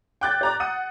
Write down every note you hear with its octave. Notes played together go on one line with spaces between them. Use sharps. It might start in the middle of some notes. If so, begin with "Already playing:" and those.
G5 D6 F#6 G6 A6
D5 A#5 D6
F#5 D#6 D#7